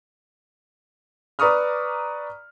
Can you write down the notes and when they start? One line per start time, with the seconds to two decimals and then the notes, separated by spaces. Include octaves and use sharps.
1.39 B4 D5 A#5 C#6 D#6 F6